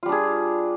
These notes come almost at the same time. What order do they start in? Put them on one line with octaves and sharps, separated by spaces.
F4 G3 D4 G#4